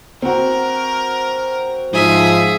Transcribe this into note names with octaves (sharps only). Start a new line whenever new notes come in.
C4 F#4 A#4
G#2 F3 G#4 E5